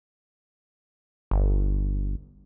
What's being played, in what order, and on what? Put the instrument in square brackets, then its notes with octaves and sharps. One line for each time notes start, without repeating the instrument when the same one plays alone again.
[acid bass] G1